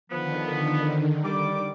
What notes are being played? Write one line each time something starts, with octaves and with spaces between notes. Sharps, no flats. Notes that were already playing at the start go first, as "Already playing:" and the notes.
D3 D#3 F3 B3
G3 D6